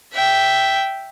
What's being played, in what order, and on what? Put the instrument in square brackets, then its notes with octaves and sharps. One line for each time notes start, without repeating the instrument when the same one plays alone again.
[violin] E5 G5